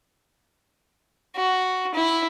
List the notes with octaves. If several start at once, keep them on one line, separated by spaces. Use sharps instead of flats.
F#4
E4